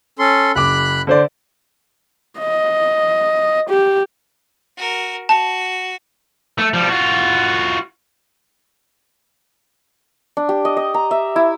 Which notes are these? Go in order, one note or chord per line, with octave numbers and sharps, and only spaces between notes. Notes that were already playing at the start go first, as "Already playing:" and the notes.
C#4 A4 C6
F#1 B5 D6 F#6
D3 C5 D5
D#5
G4
F#4 A#4
F#4 A5
A3
F3 G3
F4 F#4
D4
G4
D#5
D#5
A#5
E5
E4